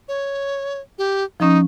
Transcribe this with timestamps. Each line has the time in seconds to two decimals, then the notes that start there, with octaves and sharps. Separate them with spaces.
0.08 C#5
0.98 G4
1.40 F3 C#4 D#4